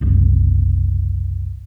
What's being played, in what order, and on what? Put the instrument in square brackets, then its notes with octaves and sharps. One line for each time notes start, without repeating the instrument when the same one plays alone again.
[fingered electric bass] F#1 C2